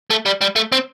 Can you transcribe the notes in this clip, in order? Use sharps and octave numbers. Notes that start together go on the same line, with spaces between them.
A3
G3
G3
A3
C4